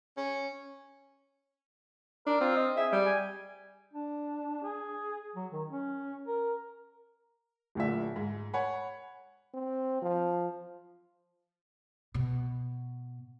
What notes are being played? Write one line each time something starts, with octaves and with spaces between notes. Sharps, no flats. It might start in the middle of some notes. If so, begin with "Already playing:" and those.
C#4
D4 A#4
C4 F4
D#5
G#4 E5
G3
G#5
D4
G#4
F#3
D#3
C#4
A#4
D1 D2 A#2 E5
G#2
C#5 F#5 G#5 B5
C4
F3
B2